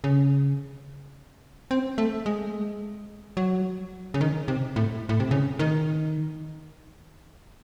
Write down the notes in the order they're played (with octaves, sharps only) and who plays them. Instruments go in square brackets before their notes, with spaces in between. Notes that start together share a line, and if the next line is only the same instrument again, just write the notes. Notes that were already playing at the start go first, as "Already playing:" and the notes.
[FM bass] C#3
C4
A3
G#3
F#3
C#3
D#3
C3
A2
A2
C3
C#3
D#3